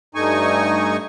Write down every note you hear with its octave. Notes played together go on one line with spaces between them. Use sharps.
G2 A3 D#4 G#5 C#6